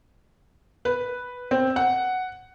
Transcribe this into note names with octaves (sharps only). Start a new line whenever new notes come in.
B4
C4
F#5